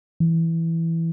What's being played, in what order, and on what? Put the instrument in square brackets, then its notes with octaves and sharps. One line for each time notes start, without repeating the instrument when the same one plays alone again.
[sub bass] E3